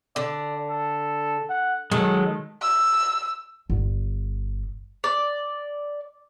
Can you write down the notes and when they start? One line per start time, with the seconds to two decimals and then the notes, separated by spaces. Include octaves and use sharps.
0.16 D3 D5
0.70 A4
1.50 F#5
1.91 D#3 F#3 G#3 A4
2.62 E6
3.70 G1
5.04 D5